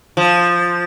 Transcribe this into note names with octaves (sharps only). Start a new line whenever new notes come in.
F3